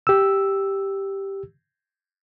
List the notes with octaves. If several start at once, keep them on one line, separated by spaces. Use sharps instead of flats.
G4 E6